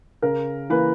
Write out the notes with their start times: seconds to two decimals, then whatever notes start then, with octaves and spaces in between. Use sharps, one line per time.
0.22 C#3 A#4
0.70 E3 A#3 B4